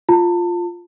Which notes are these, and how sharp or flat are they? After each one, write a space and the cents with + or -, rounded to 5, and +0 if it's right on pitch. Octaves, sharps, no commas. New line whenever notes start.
F4 +0 A5 +30